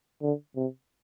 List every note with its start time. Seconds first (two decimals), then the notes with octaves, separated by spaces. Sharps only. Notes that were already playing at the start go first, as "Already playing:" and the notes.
0.22 D3
0.56 C3